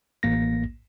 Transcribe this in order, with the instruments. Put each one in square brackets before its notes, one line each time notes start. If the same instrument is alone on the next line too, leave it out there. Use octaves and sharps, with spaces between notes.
[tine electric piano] A1 A#3 A#6